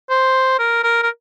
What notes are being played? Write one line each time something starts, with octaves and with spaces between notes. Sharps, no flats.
C5
A#4
A#4
A#4